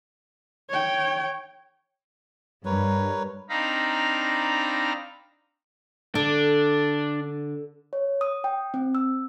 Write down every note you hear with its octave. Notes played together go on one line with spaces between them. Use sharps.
C#5 G5
G2 A#4 B4 C#5
C4 D4 D#4 F5 A#5 B5
D3 D4
C#5
D#6
G5
C4
E6